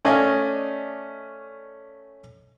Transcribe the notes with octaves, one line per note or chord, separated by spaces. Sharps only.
A3 C#4 D5 D#5 F5 G#5